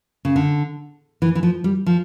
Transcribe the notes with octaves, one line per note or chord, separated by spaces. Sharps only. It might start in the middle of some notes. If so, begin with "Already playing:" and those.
C#3
D3
E3
E3
F3
G3
F3